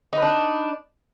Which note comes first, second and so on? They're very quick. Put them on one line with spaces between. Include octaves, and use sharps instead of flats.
D#4 B4 D4